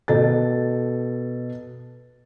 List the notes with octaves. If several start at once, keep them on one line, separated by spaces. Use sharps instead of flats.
B2 A4 A6